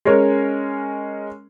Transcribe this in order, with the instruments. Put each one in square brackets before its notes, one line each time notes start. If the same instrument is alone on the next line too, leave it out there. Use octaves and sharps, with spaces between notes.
[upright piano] G#3 C#4 A#4 C#5